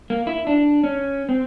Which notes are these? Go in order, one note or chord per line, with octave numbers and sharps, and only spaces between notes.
A#3
E4
D4
C#4
C4